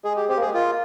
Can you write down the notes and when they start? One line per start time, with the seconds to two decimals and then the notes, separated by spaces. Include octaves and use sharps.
0.04 G#3 G#4
0.16 G4
0.29 C4 G4
0.37 A#3
0.42 G#4
0.46 G#3
0.54 A#3 F4